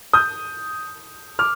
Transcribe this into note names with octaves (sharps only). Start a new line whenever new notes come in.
D#6 G6
D6 F6